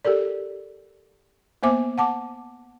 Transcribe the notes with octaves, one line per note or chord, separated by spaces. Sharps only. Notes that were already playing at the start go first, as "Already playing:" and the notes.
G4 A4 A#4 D5
A#3 B3 C5 E5 G#5 D6
F#5 A5 D6